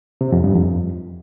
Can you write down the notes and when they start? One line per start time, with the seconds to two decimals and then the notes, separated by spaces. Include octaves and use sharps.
0.21 C3
0.32 F2
0.44 G2
0.55 F2